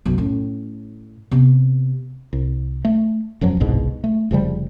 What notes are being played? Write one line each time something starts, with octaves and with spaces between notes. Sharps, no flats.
B1 F#2
A2 C#4
C3 B3
C2
A3
E1 F#2 F3 F#3
G1 C2 G#2 B2
A3
F1 C#3 F3 G3